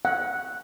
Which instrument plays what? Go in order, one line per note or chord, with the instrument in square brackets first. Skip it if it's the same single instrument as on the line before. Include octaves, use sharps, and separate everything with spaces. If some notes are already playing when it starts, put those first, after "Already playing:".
[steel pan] F#5